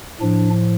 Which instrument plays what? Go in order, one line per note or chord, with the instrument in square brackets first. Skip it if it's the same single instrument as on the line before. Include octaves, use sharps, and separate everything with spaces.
[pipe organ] A2 F3 D4